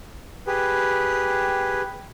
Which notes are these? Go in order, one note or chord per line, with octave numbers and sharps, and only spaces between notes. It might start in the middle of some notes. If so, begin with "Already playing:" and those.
G4 G#4 B4